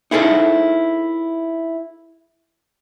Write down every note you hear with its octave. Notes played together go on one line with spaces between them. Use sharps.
D#4 E4 G#4 A4 C5